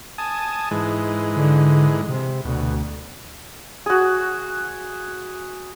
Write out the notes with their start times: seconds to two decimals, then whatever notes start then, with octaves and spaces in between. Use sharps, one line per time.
0.18 G#5 A5 D#6
0.71 G#2 E3 G#3
1.36 D3
2.09 C3
2.45 D2 B2
3.86 F#4 G#4